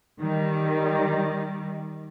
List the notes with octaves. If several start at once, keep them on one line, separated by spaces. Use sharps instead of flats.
D#3 G3